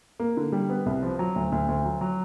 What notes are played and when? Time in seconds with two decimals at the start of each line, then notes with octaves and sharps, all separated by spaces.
0.20 A#3
0.37 D3
0.52 G3
0.70 B3
0.86 C2
1.03 F3
1.19 F#3
1.36 D2
1.52 D2
1.68 D2
1.85 F#3
2.01 F#3